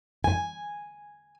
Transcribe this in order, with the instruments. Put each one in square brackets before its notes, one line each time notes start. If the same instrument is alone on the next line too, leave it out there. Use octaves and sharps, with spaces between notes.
[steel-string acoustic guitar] G#5